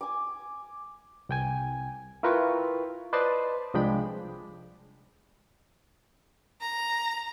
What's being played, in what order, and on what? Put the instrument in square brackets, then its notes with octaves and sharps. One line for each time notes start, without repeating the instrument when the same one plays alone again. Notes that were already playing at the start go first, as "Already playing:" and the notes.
[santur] G#5 D6
[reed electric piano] C2 G5 G#5
E4 F4 A#4 B4 G5 C#6
B4 C5 D5 D#5 A5 C6
C2 F3 G#3 D4 G5 B5
[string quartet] A#5